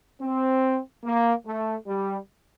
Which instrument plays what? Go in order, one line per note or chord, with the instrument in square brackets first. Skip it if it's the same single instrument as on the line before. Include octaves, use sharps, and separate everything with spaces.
[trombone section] C4
A#3
A3
G3